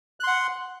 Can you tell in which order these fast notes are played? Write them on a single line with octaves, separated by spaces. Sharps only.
F#6 C6 F#5